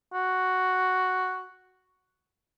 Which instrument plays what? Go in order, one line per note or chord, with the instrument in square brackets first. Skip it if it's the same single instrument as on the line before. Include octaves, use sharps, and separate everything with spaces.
[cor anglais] F#4